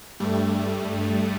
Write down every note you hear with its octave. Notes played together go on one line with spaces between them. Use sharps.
G2 G3 A3